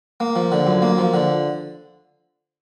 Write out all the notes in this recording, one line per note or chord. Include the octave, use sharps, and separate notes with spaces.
A#3
F3
D3
F#2
A#3
F3
D3